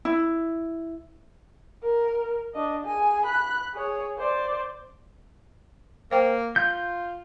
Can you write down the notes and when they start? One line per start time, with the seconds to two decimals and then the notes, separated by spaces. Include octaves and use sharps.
0.05 E4
1.83 A#4
2.54 D4 D#5
2.85 G#4 G#5
3.25 B5 F#6
3.74 G#4 C#5
4.18 C5 D5
6.11 A#3 C5 G5
6.56 F4 G6